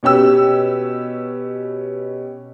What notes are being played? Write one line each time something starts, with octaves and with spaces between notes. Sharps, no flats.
B2 C#4 G4 E6